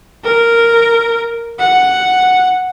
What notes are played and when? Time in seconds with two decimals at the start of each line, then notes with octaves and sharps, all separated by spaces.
0.24 A#4
1.59 F#5